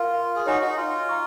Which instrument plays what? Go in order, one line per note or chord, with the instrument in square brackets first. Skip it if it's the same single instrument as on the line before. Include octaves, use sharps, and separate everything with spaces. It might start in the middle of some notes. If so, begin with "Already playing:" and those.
Already playing: [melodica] F4 [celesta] A#4 F5 C6
[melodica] G#4
[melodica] D#4 F#4 [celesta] C#5 G#5 C#6
[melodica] D#4 F#4
F4
[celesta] F5 A#5 C#6